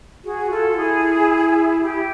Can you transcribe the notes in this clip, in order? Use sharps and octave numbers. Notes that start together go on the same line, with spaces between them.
F#4 G#4
F4 A4
F4
E4 G#4
G4